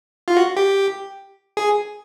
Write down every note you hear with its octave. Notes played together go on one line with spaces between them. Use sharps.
F4
F#4
G4
G#4